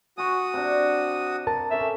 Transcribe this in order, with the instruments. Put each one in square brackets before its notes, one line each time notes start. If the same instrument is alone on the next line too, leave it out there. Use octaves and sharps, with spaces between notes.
[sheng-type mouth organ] F#4 D#6 [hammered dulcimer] G#5 C#6
[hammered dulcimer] C3 D4
[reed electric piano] A#4 A5
[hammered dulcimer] C#4 A4 C5 [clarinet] E5